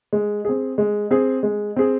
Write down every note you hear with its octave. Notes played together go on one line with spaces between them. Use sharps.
G#3
C4 G#4
G#3
C4 G#4
G#3
C4 G#4